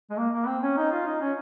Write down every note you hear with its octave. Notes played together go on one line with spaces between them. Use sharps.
G#3
A#3
A#3
C4
C#4
D#4
F4
D#4
C#4